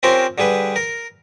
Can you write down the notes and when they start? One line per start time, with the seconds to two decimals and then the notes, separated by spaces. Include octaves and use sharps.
0.03 C4 C#4 F4 G4 A#4 C5
0.38 D3 G3 G#4 B4
0.76 A#4